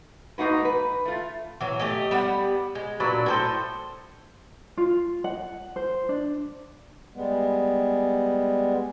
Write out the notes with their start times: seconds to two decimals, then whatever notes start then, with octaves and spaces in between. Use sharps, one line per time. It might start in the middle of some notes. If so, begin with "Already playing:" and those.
0.38 G#2 A#3 D#4 F#4 B4
0.65 B4
1.05 A3 F4
1.61 E3 F#3
1.79 A3 G4 D#5
2.11 G3 B3 F5 F#5
2.75 G#3
3.00 A#2 F#3 D4 B4
3.26 A2 A4 C5
4.77 F4
5.24 F#5
5.76 C5
6.09 D4
7.15 G3 G#3 B3